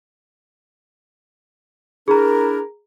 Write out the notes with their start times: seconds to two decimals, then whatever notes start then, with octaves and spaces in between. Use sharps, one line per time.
2.08 D4 E4 G#4 A#4 A#5